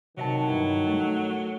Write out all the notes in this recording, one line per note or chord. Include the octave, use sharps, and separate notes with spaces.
C3 D#3 F#3 D#5 A5
G2 E4
A3